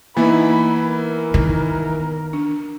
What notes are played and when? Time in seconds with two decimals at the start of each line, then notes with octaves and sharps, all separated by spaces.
0.17 E3 A#3 B3 D#4 E4 B4 B5
0.85 A#4
1.34 D#3
2.33 D4